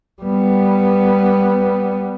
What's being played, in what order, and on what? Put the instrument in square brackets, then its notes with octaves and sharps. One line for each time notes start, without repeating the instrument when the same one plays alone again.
[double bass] G3 B3